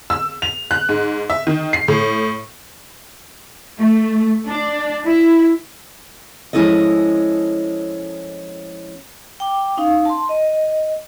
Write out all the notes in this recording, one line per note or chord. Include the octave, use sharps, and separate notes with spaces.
E6
F7
F#6
G#2
E5
D#3
C7
A2
A3
D4
E4
F3 G#3 C#4 E4 A4 D#5
G5 D6
C#4 D#4 F5
A5 C6
D#5